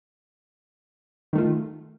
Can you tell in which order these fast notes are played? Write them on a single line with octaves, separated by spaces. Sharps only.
D#3 A3 F4